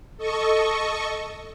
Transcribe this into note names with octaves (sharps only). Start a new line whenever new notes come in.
A4 D#5 C#6